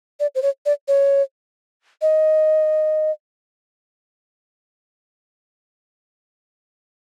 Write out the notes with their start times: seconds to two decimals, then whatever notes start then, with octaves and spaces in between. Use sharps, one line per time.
0.20 D5
0.35 C5
0.42 C#5
0.66 D5
0.88 C#5
2.02 D#5